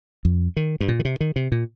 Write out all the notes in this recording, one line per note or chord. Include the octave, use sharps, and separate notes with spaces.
F2
D#3
G2
A#2
D#3
C3
D#3
C3
A#2